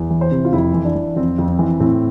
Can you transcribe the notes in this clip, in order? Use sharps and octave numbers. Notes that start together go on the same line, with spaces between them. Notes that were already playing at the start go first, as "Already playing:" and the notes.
Already playing: E2
E3
C5
C3
F4
F2 E4
E3
D4
E3
F2 C4
F2
C4
E3
A2 C4